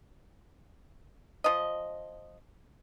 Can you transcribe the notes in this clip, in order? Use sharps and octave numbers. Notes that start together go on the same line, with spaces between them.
F3 D#5